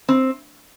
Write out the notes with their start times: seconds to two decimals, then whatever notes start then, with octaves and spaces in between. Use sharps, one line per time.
0.09 C4